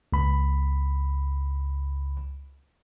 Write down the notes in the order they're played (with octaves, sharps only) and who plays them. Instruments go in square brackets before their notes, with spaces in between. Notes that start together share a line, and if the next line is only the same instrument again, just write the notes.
[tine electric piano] C#2 B5